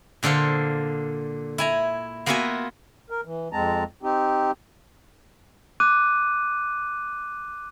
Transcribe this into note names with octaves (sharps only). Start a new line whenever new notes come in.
A#2 D3 A4 C5 F5
E4 G#5 A#5
A#3 B3 F4 F#4 E5 G#5
A#4
E3
F2 G#3 C4 A5 A#5
C4 D#4 G4
D6 F#6 D#7